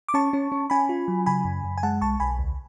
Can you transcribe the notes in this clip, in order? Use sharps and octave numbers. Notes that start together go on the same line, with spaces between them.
D6
C#4 A5 C#6
C#4
C#4
C#4 G#5 B5
F4
F#3
C#3 G#5 B5
F#2
F#2
G#5
G#3 F#5 A5
B1 A5 C#6
B1 G#5 B5
D2